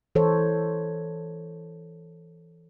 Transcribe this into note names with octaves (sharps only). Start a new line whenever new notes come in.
E3 A4 C5 C#5